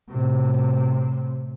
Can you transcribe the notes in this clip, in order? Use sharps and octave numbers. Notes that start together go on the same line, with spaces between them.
A2 C3